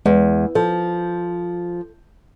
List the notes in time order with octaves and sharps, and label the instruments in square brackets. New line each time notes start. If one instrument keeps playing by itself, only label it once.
[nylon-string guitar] E2 [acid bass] G#3
[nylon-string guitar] F3 [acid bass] A4